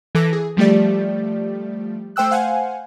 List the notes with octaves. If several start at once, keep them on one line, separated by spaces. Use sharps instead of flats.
E3 A4 D6 A#6
G#4
F3 G3 A3 G4 D5
A3 C5 G5 E6 F#6
C5 F5 F#5 G#5